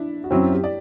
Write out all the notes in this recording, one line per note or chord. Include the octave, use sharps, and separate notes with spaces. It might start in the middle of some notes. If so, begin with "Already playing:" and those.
Already playing: D4 E4
F#4
F#2 F#3 C4 E4
E4
G4
D5